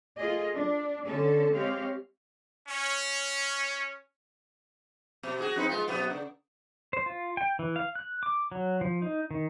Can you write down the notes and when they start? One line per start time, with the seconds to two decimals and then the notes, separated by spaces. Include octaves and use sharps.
0.18 A3 F4 G#4 D#5
0.54 D4
1.06 D3 C#4 A4
1.52 G#3 C4 G4 C#5 F5
2.68 C#4
5.23 B2
5.40 F#4 G#4
5.56 C4 D#4 B4
5.69 G#3 F4
5.88 F#2 B2 B3
6.10 C#3
6.93 C5
7.06 F4
7.37 G5
7.59 E3
7.76 F5
7.95 F#6
8.23 D6
8.52 F#3
8.81 F3
9.02 D#4
9.31 D#3